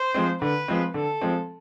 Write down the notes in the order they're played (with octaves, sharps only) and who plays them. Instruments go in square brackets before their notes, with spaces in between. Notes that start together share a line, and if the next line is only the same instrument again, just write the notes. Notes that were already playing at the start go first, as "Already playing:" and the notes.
Already playing: [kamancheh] C5
[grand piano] F3 G#3 C4
[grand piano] D3 [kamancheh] B4
[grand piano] F3 G#3 C4
[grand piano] D3 [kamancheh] A4
[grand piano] F3 G#3 C4